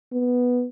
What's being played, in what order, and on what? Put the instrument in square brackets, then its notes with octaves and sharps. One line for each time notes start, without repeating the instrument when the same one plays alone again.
[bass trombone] B3